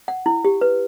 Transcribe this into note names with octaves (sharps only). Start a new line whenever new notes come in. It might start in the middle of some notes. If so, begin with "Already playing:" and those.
F#5
E4
G4
B4